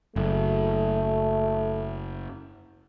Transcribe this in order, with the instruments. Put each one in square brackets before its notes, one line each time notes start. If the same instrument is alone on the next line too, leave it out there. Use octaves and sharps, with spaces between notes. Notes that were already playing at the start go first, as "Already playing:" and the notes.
[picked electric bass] F#1 [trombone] A3